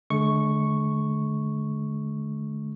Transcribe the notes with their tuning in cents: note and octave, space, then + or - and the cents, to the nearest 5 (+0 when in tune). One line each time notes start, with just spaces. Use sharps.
D3 +0 G#3 +45 C#6 -5